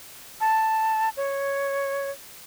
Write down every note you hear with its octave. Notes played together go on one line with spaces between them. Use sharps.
A5
C#5